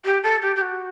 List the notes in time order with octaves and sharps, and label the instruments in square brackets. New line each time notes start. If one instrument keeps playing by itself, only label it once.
[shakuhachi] G4
A4
G4
G4
F#4